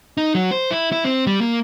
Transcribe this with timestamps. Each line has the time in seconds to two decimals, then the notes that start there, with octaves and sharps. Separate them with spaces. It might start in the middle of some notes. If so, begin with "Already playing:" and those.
0.17 D#4
0.35 F#3
0.51 C5
0.71 E4
0.92 E4
1.04 C4
1.27 G3
1.41 A#3